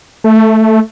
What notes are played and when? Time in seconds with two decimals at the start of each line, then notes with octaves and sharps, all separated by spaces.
0.24 A3